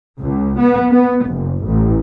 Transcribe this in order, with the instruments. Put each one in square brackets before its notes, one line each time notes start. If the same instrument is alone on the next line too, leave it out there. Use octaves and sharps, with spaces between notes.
[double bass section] C#2
B3
B3
F#1
A1